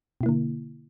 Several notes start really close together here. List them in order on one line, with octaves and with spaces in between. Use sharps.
B2 E4 A#3 D3